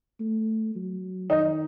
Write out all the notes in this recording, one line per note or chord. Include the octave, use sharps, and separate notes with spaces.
A3
F#3
D#3 D#4